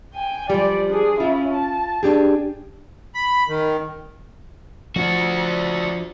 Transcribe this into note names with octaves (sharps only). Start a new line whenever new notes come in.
G5 G#5
F3 G3 D5
D4 G#4
C#4 E4 F4
A5
D4 G4 G#4
B5
D#3
F3 D4 F#4